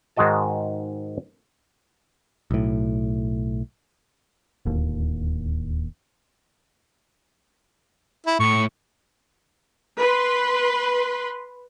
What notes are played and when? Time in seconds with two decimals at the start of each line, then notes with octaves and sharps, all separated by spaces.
0.17 G#2 D#3 G#3 F#4 D#5 A5
2.51 B1 A2
4.65 D1 D#2
8.26 E4
8.40 A2 C#6
9.99 B4 C6